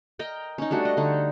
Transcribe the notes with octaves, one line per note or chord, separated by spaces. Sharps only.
A#4 D#5 G5
C#4 D#4
G3 A3 D4 F#4
D#5
D3 D#4